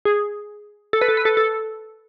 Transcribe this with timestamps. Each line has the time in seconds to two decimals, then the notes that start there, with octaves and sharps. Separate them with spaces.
0.05 G#4
0.93 A4
1.01 B4
1.08 A4
1.17 B4
1.25 A4
1.37 A4